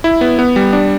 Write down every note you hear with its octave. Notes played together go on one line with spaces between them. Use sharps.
E4
B3
B3
G3
D4